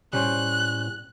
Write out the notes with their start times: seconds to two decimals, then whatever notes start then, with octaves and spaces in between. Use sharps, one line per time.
0.13 A2 G3 C#4 C5 F#6